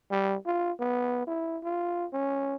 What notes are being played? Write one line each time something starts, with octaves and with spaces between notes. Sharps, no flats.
G3
F4
B3
E4
F4
C#4